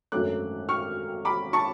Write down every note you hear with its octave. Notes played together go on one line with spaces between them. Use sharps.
G#1 F#2 D3 F#3 A3 D6 F#6
C#6 F6
B5 D6
A5 C#6